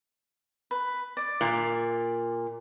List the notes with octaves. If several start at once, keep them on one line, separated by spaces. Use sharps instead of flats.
B4
D5
A#2